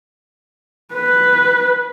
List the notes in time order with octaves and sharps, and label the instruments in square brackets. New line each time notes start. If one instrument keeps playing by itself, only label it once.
[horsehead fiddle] B4